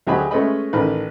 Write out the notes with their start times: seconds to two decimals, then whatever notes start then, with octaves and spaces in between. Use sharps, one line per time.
0.07 D2 F#3 G4 G#4 D#5 B5
0.31 G#3 A3 C#4 B4 D#5 B5
0.73 A1 D#3 B4